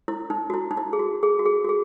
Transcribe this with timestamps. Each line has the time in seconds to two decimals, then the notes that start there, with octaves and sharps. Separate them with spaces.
0.08 E4
0.30 D#4
0.50 F#4
0.54 E4
0.71 D#4
0.77 E4
0.93 G#4
0.99 F#4
1.23 G#4
1.39 F#4
1.46 G#4
1.65 F#4
1.69 G#4